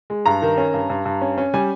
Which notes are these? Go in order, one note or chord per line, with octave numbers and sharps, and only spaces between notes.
G#3
G2 A#5
D#3
C#4
G2
G2
G2
C#4
C#4
G3 G#5